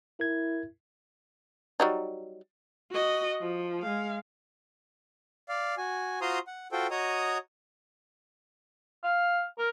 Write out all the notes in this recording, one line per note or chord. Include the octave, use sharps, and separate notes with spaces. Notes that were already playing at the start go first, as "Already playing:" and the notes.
E4 A#4 G#6
F#3 G3 D#4
F#4 D#5
F3
G#3 F5
D5 F5
F#4 G#5
F4 F#4 C5 A#5 C6 D#6
F#5
F4 F#4 A4 C5 G5
F#4 C#5 D#5 A#5 D#6
F5
A#4